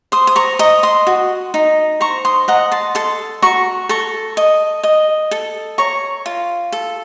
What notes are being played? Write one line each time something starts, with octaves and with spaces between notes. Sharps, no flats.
C5 C6 D#6
D#6
A#5 C#6
D#5 A#5 C#6
C6 D#6
F#4
D#4
C5 A#5 C#6
C6 D#6
D#5 F#5 A#5
A5 C6
A4 A5 C6
F#4 A#5 C#6
A4 A#5 C#6
D#5
D#5
A4
C#5 A#5 C#6
F4
A4